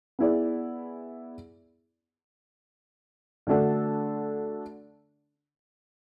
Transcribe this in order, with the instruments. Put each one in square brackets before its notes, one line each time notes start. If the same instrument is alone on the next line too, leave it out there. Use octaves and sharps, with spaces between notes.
[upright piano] B3 E4 G#4 D5
D3 A3 D4 F#4 A4